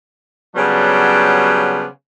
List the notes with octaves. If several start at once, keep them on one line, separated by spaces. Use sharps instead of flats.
C#3 F#3 G3 B3 D4 C5